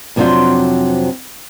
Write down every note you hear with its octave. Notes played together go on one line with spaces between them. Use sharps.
F2 C3 F#3 D4 F4 C5